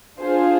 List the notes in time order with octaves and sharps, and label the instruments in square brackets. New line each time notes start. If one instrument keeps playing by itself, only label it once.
[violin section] D4 F4 G#4 C5